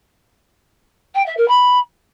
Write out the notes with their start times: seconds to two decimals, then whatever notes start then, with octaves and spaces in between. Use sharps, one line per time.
1.15 G5
1.26 E5
1.37 A#4
1.48 B5